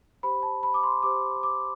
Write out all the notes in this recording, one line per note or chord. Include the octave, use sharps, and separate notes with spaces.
G4 C5 B5
A5
B5
D6
C6
G4 C5 D6
D6